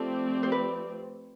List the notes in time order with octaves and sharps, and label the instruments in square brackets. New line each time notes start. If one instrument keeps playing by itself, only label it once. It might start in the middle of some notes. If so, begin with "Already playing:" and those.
Already playing: [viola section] F3 A3 C4 G4 D5 [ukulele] A4
[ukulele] C5
B4